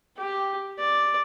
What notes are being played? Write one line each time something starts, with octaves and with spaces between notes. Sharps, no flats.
G4
D5